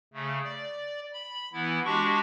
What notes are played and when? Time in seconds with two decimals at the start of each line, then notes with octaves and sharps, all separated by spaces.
0.13 C#3 A3
0.44 D5
1.13 B5
1.53 E3 B3 E4
1.85 G#3 D4 F#4 G4 C#6